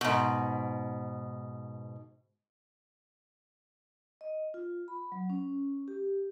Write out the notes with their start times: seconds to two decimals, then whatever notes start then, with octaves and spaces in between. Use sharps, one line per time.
0.01 G#2 B2
4.21 D#5
4.54 F4
4.88 B5
5.12 F#3
5.30 C#4
5.88 G4